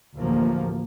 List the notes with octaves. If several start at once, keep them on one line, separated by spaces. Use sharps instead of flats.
A1 D2 F3 A#3